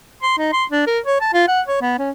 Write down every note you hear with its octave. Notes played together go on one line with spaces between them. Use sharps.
C6
D#4
C6
D4
A#4
C#5
A5
F4
F#5
C#5
B3
C#4